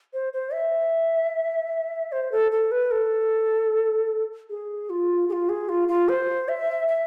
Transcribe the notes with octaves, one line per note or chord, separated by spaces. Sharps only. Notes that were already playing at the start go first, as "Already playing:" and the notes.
C5
C5
E5
C5
A4
A4
B4
A4
G#4
F4
G#4
F4
G#4
F4
F4
C5
E5
E5